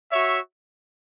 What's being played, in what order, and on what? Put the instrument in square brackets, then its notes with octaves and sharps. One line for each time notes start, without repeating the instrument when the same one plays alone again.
[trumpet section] F#4 C#5 E5